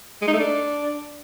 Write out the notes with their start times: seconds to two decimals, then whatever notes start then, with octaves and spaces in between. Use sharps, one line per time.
0.22 G#3
0.28 D#4
0.33 A3
0.39 D4